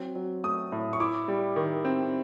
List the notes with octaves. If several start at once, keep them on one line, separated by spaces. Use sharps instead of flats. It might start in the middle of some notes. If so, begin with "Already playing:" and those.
Already playing: F#3 C4
F#3
A3 D#6
A2
C#6
E4 D6
G3
D#3
C4